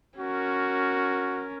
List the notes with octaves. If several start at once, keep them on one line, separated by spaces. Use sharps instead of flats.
C#4 F#4 A#4